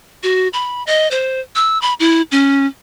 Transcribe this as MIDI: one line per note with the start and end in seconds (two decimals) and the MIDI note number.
0.23 0.48 66
0.53 0.83 83
0.87 1.09 75
1.11 1.40 72
1.56 1.80 88
1.82 1.93 83
2.00 2.22 64
2.32 2.66 61